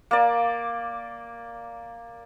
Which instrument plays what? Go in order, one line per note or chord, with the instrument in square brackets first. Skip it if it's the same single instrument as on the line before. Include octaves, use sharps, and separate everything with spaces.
[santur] A#3 D5